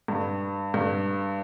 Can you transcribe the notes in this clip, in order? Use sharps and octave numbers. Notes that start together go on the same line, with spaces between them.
G2
G2